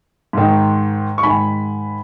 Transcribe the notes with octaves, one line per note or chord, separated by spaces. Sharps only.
G#2 D#3
C#6
G#2 D#3 G#5 B5